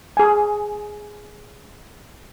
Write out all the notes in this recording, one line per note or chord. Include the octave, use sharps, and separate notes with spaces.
G#4 G#5